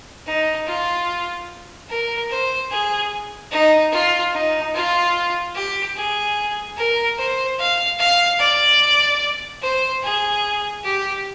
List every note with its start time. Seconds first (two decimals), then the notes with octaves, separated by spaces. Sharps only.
0.26 D#4
0.67 F4
1.89 A#4
2.30 C5
2.71 G#4
3.51 D#4
3.92 F4
4.33 D#4
4.74 F4
5.55 G4
5.96 G#4
6.77 A#4
7.18 C5
7.58 F5
7.99 F5
8.39 D5
9.62 C5
10.03 G#4
10.83 G4